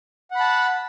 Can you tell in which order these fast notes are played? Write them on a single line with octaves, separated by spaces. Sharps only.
F#5 B5 A5